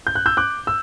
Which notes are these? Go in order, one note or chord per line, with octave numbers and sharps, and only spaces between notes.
G6
F#6
E6 G6
D6 F#6
E6